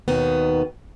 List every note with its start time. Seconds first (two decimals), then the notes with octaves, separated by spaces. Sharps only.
0.08 D#2 B2 D#3 B3